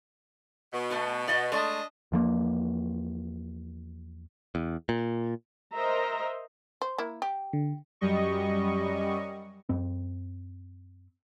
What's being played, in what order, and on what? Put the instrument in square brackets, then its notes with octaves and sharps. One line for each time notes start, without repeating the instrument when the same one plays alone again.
[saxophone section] B2
[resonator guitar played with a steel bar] A3 B3 F#4
D5 D#5 F#5
[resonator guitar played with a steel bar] G#3 A3 [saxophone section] D4 D#5
[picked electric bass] E2 F3 G#3 A#3
E2
A#2
[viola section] A#4 C5 D#5 E5 A#5
[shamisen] C5
A#3 E4
G4
[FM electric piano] D3
[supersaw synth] F#2 G3 D#5 C#6
[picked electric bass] F#2 C4